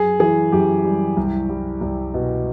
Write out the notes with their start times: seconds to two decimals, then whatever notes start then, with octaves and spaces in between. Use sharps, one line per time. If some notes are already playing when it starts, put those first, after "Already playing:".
Already playing: F#2 G#4
0.20 E3 G#4
0.52 F#2 G4
0.84 G3
1.17 C2
1.49 G3
1.81 C2
2.14 B2